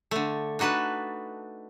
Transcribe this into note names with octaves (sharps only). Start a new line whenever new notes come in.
D3 A3
D4 D#4 F#4 B4 A5